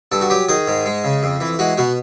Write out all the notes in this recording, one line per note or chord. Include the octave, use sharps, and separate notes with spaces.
G2 A4
F#4
F#3 G4
D#3 G#4
G#2
G#3
C#3
F2
E3
G#3 F#4
B2 F#4